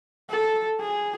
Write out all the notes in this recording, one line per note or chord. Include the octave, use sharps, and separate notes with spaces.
A4
G#4